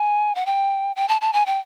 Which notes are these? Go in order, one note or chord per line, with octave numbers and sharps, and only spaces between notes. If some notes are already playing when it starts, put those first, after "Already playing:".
Already playing: G#5
F#5
G5
G5
A5
A5
G#5
G5